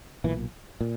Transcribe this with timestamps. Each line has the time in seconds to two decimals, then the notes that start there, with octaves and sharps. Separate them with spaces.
0.24 B1 A#2 E3
0.81 A#2